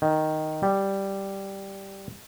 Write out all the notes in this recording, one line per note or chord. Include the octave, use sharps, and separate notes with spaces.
D#3
G3